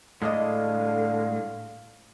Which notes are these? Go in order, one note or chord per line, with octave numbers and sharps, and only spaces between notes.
A2 D3 G#3 A#3 D4 D#5 F5